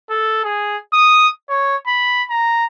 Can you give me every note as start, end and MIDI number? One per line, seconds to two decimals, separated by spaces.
0.10 0.43 69
0.45 0.78 68
0.94 1.29 87
1.50 1.76 73
1.87 2.24 83
2.30 2.65 82